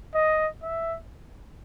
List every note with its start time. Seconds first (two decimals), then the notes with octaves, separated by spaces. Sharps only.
0.14 D#5
0.62 E5